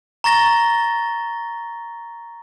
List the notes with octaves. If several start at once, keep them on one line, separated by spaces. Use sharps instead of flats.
A#5 C#6 A6 A#6 G7